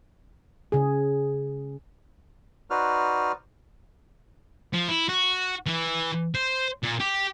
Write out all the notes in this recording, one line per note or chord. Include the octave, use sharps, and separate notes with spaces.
C#3 G#4
D#4 F#4 B4 C5 D5 F6
F3
E4
F#4
E3
C5
A#2
G4